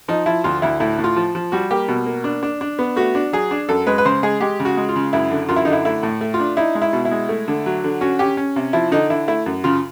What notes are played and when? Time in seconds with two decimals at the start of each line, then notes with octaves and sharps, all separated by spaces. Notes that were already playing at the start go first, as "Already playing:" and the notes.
0.08 F3 D#4
0.26 F3 E4
0.44 D2 F4
0.62 D2 E4
0.80 A2 E4
0.99 A2
1.04 F4
1.16 F3
1.35 F3
1.52 G3 F#4
1.71 A#3 G4
1.88 B2
2.06 A#3
2.24 D4
2.43 D4
2.61 D4
2.79 B3
2.96 A3 F#4
3.15 D4
3.33 F#3 G#4
3.51 D4
3.69 F#2 A4
3.87 G#3 B4
3.98 B4
4.05 C#3 C5
4.23 G#3 G#4
4.40 G#3 G4
4.60 C#3
4.65 F#4
4.77 G#3
4.89 F4
4.96 C#3
5.13 F#2 E4
5.31 D3
5.49 F#2 F4
5.56 E4
5.65 D3 D#4
5.73 E4
5.85 A3 E4
6.03 A2
6.21 A3
6.34 F4
6.40 D4
6.57 D#4 E4
6.75 G#3
6.82 E4
6.93 B2
7.05 E4
7.11 G#3
7.29 A3
7.48 D3
7.66 F#3
7.84 D3
8.01 C#4 F#4
8.19 C#4 G4
8.37 C#4
8.56 C3
8.73 F3 E4
8.91 D3 D#4
9.10 D3 E4
9.28 A3 E4
9.46 F#2
9.64 C#3 F4